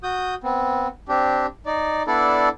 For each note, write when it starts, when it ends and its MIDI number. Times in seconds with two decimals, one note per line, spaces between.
0.03 0.35 66
0.03 0.35 87
0.03 0.35 91
0.44 0.88 59
0.44 0.88 60
1.08 1.46 60
1.08 1.46 62
1.08 1.46 67
1.66 2.03 63
1.66 2.03 74
2.07 2.49 59
2.07 2.49 62
2.07 2.49 64
2.07 2.49 69
2.07 2.49 74